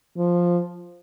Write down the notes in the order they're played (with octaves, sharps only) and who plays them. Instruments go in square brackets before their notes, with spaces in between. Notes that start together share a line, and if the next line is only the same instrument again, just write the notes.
[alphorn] F3